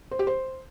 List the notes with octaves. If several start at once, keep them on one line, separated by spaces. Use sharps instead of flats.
C5
G4
C5